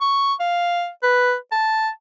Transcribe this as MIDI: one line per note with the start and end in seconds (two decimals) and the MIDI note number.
0.01 0.34 85
0.40 0.89 77
1.03 1.35 71
1.52 1.89 81